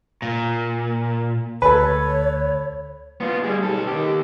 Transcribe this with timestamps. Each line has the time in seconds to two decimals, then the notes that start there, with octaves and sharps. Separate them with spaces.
0.22 A#2
1.62 D2 A4 B4 C#5
3.20 B3 F4
3.44 G3 G#4
3.62 B1 A4
3.87 D#2 G4